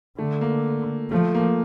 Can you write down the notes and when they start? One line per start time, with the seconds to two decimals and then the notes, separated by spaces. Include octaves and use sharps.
0.18 D3 A3
0.41 A#3
1.11 F3 A3
1.35 A#3